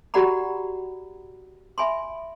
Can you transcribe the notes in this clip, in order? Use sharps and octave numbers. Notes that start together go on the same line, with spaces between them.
F#4 G4 D5 F#5 A#5 B5
E5 G#5 B5 C6